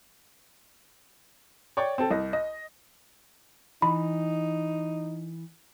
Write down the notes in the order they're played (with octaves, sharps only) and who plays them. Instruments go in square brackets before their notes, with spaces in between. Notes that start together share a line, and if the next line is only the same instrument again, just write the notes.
[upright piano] C#5 D5 G5 C#6
C4 A4
C2 D#5
D#5
[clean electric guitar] E3 [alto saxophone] D#4 [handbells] B5